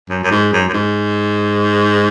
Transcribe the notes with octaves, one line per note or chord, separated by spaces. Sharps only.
F#2
F#2
G#2
F#2
F#2
G#2